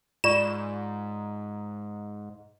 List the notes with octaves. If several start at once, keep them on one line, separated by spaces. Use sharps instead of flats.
G#2 F4 D5 C#6 E7